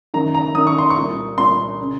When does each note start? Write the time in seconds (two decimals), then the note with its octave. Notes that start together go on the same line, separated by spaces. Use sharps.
0.14 F#2 D#3 A#5
0.35 A#5
0.55 F#2 D#3 D#6
0.67 C#6
0.78 C6
0.90 C#6
0.96 C2 A#2
1.38 C2 A#2 C6
1.81 C#3